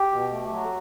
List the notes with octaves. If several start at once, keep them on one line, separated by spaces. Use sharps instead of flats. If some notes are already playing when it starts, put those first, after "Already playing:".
Already playing: G4
B2
A3
F#3